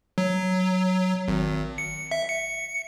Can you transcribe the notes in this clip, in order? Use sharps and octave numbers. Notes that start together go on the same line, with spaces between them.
F#3
G#1
C#7
E5
C#7